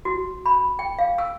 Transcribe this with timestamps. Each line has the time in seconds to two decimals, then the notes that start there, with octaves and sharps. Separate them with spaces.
0.05 F#4
0.46 B5
0.79 G5
0.99 F5
1.18 E6